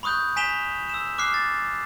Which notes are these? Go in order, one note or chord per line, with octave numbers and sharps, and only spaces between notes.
B5 C#6 D#6 F#6 G6
G#5 B6 E7 F7 G7
E6 E7
D6 F6 F#6 C7
A6